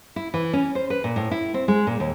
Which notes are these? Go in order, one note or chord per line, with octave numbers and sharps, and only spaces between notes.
E4
E3
C#4
C5
B4
A#2
A2
E4
C4
G#3
A#2
D#2